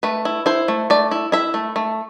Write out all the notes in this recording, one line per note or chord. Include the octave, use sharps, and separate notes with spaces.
A3 B4
E4
E4 C5
A3
A3 D5
E4
E4 E5
A3
A3